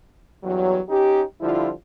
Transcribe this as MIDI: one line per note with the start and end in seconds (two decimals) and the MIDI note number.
0.44 0.80 40
0.44 0.80 43
0.44 0.80 54
0.89 1.21 61
0.89 1.21 63
0.89 1.21 67
1.41 1.71 50
1.41 1.71 53
1.41 1.71 55
1.41 1.71 64
1.41 1.71 65